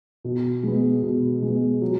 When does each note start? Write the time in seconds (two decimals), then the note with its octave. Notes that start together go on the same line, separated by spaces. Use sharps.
0.24 B2
0.63 G#3 B3
1.03 B2
1.42 G#3 B3
1.82 F#3